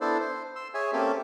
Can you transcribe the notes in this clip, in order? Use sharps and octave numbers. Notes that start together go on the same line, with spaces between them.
B3 D4 E4 A4 C5 D5
C5
C6 E6
G#4 C#5 E5 G#5
A#3 C4 C#4 G4 A4 E5